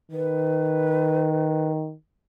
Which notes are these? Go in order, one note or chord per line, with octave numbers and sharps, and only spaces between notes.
D#3 B4